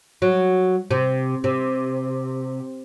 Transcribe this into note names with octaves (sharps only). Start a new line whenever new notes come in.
F#3
C3
C3